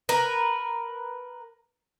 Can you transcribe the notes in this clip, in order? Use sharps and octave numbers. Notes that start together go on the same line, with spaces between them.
A#4 B4